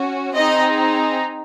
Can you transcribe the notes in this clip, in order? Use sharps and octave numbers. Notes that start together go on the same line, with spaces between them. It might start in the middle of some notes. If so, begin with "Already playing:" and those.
Already playing: C#4 F#4
C4 D#4 G#4 D#5